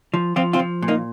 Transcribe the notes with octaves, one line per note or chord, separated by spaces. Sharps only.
F3
F3 C4 F4
C4 F4
F3
A#2
A#3 D#4